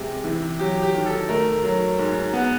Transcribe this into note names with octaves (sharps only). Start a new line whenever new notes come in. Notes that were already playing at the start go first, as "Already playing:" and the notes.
Already playing: C3 G#3
E3
F#3 G4
G4
D#3
A4
A3 A#4
F#3
G#2
B3